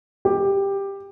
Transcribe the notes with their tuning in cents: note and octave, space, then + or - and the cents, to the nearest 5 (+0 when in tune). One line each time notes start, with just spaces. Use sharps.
G4 +10